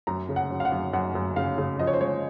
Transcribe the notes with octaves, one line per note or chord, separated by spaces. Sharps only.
F#2 A#5
C#3
F#5
F#3
F5
F#5
F#2
F#2 F#5
F#2
C#3 F5
C#3
F3 D#5
C#5
C5
G#3 C#5